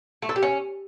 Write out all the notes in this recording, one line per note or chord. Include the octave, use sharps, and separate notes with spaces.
A3
A4
G4
C#4